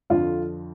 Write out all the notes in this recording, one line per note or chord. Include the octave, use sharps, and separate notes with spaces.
F2 D3 F3 F4